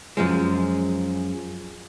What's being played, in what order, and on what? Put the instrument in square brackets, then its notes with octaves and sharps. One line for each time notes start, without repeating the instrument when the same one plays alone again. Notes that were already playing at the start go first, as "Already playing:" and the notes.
[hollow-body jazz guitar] F#2 F3 G#3